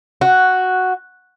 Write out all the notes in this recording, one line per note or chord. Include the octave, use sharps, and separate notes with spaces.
F#4